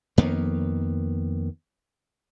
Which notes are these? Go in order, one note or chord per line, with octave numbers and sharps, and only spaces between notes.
F2 D#3 A#3 B3